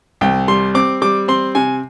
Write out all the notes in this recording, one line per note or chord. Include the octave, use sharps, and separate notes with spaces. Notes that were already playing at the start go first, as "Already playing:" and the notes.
C2 G5
G3 C6
C4 D6
G3 D6
C4 C6
C3 G#5